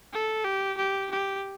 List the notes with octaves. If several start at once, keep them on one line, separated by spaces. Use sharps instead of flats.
A4
G4
G4
G4